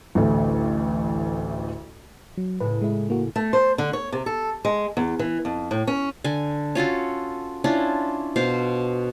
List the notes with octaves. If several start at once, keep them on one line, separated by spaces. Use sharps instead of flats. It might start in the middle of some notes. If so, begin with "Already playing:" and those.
A1 D2 A3
F#3
A2 C#3 B4
G#3 E4
A#3 F#4
A3
C5
D3
C#5
C3
A4
G#3
E2
E3
F2
A2
C#4
D3 G#5
C#4 F4 F#4 A4
C#4 D4 E4 F4
B2 C5 F5